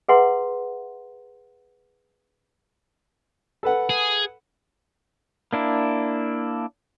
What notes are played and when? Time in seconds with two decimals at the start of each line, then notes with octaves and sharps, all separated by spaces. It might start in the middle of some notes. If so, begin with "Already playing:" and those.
0.08 G#4 B4 E5 F#5 A#5 C6
3.63 A4 B4 F#5
3.90 G#4
5.53 A#3 D4 E4